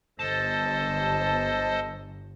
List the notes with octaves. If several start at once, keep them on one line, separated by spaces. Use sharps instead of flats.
G1 A4 C5 D#5 A5